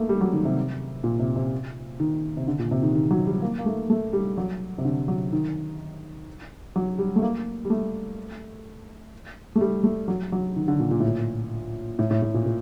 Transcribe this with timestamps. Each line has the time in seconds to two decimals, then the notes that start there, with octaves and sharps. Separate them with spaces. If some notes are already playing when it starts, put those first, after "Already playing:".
Already playing: A3 A#3
0.09 G3
0.21 F#3
0.33 D#3
0.45 C3
1.04 A#2
1.19 C3
1.36 C3
2.00 D#3
2.37 C3
2.48 D3
2.59 A#2
2.71 C3
2.83 D#3
2.95 D#3
3.11 F#3
3.26 G3
3.42 A#3
3.58 A#3
3.66 A3
3.90 A3
4.13 G3
4.37 F#3
4.78 C3
4.85 D3
5.08 F#3
5.32 D#3
6.76 F#3
6.99 G3
7.16 A3
7.22 A#3
7.65 G3
7.70 A3
9.56 A3
9.61 G3
9.84 A3
10.08 F#3
10.32 F#3
10.56 D#3
10.68 D3
10.80 A#2
10.91 A#2
11.00 A2
11.07 A#2
11.99 A2
12.11 A2
12.22 A2
12.34 A#2
12.46 A#2